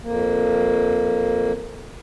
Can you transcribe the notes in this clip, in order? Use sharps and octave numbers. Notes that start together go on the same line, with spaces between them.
F2 A#3